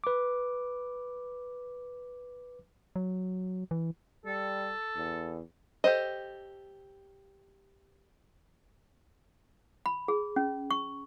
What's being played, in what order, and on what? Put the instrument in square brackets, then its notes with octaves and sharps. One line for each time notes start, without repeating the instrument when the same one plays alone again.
[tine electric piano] B4 D6
[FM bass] F#3
E3
[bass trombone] G3 [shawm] A4
[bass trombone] E2
[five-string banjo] G4 A4 C5 D#5
[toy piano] B5
G#4
C#4
C#6